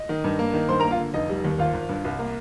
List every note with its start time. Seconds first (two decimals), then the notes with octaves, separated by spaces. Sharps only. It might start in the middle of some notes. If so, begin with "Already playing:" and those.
Already playing: D#5
0.09 D#3
0.24 G2
0.39 A#3
0.54 D#3
0.69 G2 C5 C6
0.80 A#4 A#5
0.84 A#3
0.91 F4 F5
0.98 D3
1.14 F1 D#4 D#5
1.29 G3
1.45 D#2
1.58 G#1 F4 F5
1.74 G#1
1.89 G2
2.04 C2
2.19 A#3